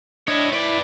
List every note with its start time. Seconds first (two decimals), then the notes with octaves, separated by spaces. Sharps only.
0.28 D4 E4 C#5 D#5
0.53 E4 B4 D5